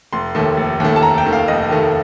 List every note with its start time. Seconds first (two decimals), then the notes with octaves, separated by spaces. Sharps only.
0.13 F1 C6
0.35 D#2 D#3 A3
0.57 F1
0.80 D#2 D#3 A3
0.96 A5
1.03 F1 A#5
1.18 G5
1.25 D#2 D#3 A3
1.33 F5
1.48 F1 D#5
1.70 D#2 D#3 A3